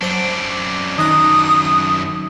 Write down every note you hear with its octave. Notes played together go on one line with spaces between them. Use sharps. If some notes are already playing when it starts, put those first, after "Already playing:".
F#2 F#3 D4 C5 D6
D#3 D#4 D#6 F#6